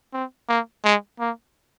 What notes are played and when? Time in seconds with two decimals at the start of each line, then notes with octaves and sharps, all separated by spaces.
0.13 C4
0.49 A#3
0.85 G#3
1.20 A#3